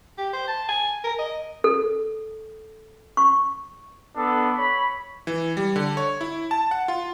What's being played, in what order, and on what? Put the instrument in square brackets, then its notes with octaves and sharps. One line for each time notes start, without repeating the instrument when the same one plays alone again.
[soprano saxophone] G4
C5
A5
G#5
A#4
D#5
[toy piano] A4
C#6
[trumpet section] B3 D4 A4
C#5 B5
[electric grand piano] E3
G3
D3
C#5
E4
A5
F#5
F4